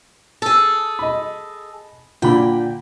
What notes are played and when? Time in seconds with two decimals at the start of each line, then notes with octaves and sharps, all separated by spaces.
0.42 G#4 A4
0.99 D#5 B5
2.22 A#2 D3 G5 B5